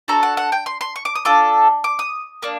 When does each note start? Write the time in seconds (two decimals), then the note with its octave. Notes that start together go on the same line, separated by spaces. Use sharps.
0.08 D4 F#4 A4 A#5
0.23 F#5
0.37 F#5
0.52 G5
0.66 C6
0.81 C6
0.96 C#6
1.05 D6
1.15 D#6
1.25 D4 F4 A4 D6
1.84 D6
1.99 D#6
2.42 A#3 D4